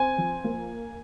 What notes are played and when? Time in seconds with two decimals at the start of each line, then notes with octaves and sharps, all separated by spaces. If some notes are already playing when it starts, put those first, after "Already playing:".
Already playing: C4 G#5
0.18 F3
0.44 A#3